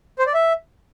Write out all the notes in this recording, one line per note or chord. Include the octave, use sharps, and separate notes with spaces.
C5
D5
E5